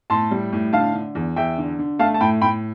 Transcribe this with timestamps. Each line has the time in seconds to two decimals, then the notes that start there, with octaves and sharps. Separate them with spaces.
0.10 A2 A5 C6
0.31 G3
0.53 A2
0.73 D3 F5 A5
0.94 D3
1.15 E2
1.36 E2 E5 G5
1.58 D3
1.79 D3
1.99 A3 F5 A5
2.14 A5
2.21 A2 G5 B5
2.41 A2 G5 B5